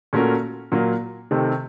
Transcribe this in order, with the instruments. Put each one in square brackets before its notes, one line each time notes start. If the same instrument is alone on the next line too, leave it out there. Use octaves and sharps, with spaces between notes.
[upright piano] A#2 A3 C#4 F#4 A#4
A#2 F#3 A#3
C3 D#3 A3 C4